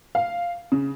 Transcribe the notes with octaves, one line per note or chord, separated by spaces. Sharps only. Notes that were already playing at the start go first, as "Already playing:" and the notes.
F5
C#3